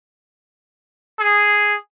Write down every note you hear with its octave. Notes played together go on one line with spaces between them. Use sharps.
G#4